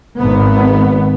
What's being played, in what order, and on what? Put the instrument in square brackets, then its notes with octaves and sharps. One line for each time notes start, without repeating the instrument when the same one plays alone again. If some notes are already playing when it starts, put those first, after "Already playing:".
[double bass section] G#1 B3